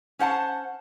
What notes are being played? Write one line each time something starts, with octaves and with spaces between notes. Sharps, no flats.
C#4 C5 F#5 A5